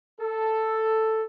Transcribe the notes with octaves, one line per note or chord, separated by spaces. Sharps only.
A4